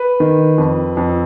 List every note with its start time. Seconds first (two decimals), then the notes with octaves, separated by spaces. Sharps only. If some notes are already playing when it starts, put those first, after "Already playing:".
Already playing: B4
0.20 D#3
0.58 F2
0.97 F2